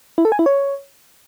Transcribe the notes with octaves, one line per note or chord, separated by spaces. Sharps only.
E4
A4
G#5
E4
C#5